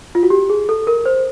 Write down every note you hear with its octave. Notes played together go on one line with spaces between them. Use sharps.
F4
F#4
G4
G#4
A4
A#4
C5